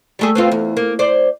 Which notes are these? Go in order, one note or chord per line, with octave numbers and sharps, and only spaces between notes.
G3 A3 G#4
B3 C4 F4
E2
A#3
C5 D5